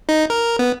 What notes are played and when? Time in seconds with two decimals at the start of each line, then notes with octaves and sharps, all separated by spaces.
0.09 D#4
0.30 A#4
0.59 B3